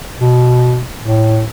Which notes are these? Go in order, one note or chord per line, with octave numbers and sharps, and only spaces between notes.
B2
A2